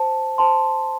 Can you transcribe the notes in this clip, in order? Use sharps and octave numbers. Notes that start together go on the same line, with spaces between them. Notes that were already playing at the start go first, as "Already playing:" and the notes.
Already playing: C5 A5
C5 A5 C6